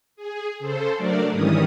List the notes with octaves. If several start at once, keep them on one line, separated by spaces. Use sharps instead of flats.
G#4
C#3 A4 C5
F#3 A3 D4 A#4 D5
G#2 D#3 E3 G3 C#4 D#6